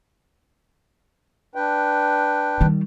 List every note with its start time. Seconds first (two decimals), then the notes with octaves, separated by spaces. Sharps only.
1.55 D4 B4 G5
2.61 D#3 G3